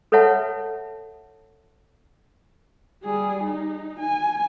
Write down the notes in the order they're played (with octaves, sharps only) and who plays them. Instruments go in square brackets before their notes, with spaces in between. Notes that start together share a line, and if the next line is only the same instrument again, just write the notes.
[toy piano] A4 B4 C#5 E5 F#5 A5
[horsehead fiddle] G3 G#4
D#4
G#5